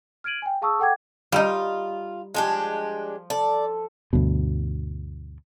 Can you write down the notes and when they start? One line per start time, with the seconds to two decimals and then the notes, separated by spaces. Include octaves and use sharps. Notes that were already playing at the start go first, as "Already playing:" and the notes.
0.24 F6 G#6 D7 D#7 F#7
0.42 G5 G#5
0.62 G#4 F5 A5 C#6 D#6 E6
0.80 A4 F#5 G5 D6 G#6
1.32 G3 D#4 F4
2.34 F3 G#3 D4 G4
3.30 A4 D5
4.13 D2 G2 B2